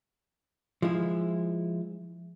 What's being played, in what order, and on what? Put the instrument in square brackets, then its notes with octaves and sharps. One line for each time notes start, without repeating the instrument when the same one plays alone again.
[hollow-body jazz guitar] F3 G#3 E4